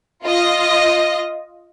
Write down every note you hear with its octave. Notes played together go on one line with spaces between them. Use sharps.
F4 D#5